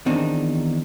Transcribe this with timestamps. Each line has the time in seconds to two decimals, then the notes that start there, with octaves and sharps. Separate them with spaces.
0.06 E2 D#3 C4 D4 D#4